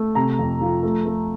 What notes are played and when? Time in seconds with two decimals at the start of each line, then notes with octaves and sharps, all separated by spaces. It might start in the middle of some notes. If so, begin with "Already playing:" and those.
Already playing: A3
0.15 C3 A#5
0.39 F2
0.61 F3
0.83 A3
1.06 A3